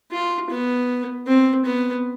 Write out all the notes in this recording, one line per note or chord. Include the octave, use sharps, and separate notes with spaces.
F4
B3
C4
B3